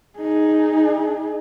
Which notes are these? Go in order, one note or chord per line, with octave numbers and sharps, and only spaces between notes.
D#4 G#4